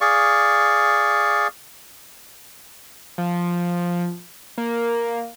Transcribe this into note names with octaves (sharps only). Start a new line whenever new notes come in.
G#4 D5 F5 C#6
F3
A#3